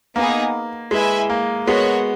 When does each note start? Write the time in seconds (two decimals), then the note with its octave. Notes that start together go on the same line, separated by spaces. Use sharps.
0.16 A#3 B3 D#4 G#4
0.91 G#3 E4 B4 E5 G#5
1.30 A#3
1.67 G#3 B3 F#4 A#4 C#5 F#5